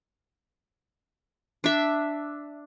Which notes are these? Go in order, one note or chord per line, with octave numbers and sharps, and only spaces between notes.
D4 E5